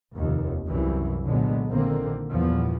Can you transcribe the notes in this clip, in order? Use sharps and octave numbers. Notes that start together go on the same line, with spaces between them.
F1 D#2
C2 F#2 C3 E3
A#2 D3 F#3 G#3 B3
A#1 D3 D#3 A#3 C4
E2 G2 A#2 F3 B3